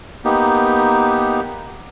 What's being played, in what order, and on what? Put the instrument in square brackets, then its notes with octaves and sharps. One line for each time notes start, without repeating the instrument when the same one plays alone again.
[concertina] A#3 B3 D#4 G4